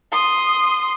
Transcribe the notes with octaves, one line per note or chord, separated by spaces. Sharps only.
C6 D#6